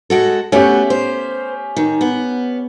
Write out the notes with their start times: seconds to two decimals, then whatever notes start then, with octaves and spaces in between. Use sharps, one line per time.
0.10 G#3 F#4 A4
0.52 A3 B3 C#4 F#4 G4
0.90 C5
1.76 D#3
2.01 B3